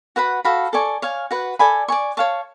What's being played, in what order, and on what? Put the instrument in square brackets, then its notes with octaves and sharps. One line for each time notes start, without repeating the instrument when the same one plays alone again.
[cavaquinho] F#4 B4 F#5 B5
F#4 A4 F5 B5
A4 D5 G#5 C#6
C#5 F5 G#5
F#4 B4 F#5
A4 D5 G#5 B5
D5 G#5 C#6
C#5 F5 A5 C#6